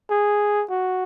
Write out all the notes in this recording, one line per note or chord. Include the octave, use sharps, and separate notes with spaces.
G#4
F#4